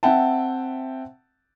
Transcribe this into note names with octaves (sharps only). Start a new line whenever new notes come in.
C4 E5 F#5 G5 A5